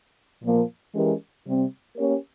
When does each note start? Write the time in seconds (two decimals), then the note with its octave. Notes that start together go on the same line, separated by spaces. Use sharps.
0.42 A#2 F3 A#3
0.94 E3 G#3 C#4 G4 A#4
1.45 C3 G3 C4
1.96 A#3 C#4 G4 A#4 C#5